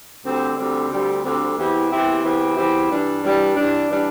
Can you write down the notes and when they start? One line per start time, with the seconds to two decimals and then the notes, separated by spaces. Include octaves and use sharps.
0.24 D2 D3 G3 C4
0.58 D2 D3 G3 C4
0.90 D2 D3 G3 C4
1.24 D2 D3 G3 C4
1.56 E2 E3 C4 E4 G4
1.91 E2 E3 C4 E4 G4
2.24 E2 E3 C4 E4 G4
2.57 E2 E3 C4 E4 G4
2.90 G2 E3 G3 D4
3.23 G2 E3 G3 D4
3.56 G2 E3 G3 D4
3.90 E3 G3 D4